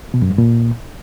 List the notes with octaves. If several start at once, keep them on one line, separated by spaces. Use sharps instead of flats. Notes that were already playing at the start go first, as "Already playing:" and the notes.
B2
F#2
G2
A#2